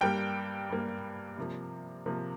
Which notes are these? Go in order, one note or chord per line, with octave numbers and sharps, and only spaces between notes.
G2 G3 A#3 G5
G2 G3 A#3
C3 F3 A#3
C3 F3 A#3